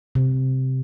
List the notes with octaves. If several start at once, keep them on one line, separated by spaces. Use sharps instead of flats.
C3